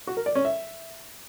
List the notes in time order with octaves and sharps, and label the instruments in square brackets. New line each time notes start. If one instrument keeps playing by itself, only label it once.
[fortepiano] F#4
A#4
D5
C#4
E5